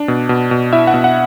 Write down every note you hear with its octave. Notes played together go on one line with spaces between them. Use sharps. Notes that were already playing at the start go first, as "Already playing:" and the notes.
Already playing: D4
B2
B2
B2
E4 E5
F#5
B2
F#5